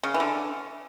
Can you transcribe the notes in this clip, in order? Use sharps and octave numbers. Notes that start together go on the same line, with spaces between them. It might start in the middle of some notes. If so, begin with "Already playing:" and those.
C#3
E3
D3